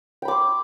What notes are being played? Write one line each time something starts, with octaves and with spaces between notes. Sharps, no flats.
G5 B5 C6 D6